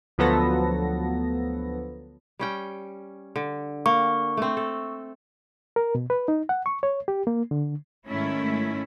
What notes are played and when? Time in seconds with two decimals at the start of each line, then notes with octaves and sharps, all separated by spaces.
0.18 D2 F3 F#3 B3 A4 A#6
2.39 G3 C#4 G5
3.36 D3
3.86 A#3 C#6
4.37 A3 C4
4.57 A4
5.76 A#4
5.95 B2
6.10 B4
6.28 D#4
6.49 F#5
6.66 C#6
6.83 C#5
7.08 G4
7.27 A#3
7.51 D3
8.06 G#2 D#3 A3 C#4 E4